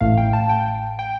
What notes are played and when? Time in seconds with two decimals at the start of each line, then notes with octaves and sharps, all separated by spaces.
0.01 A1 A2 A3 F5
0.17 G5
0.33 A5
0.49 G5
0.99 G5